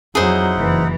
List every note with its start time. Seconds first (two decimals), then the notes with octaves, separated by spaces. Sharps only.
0.15 F2 F#3 D#4 E4 G#4 C5 F#5
0.57 F#1 E3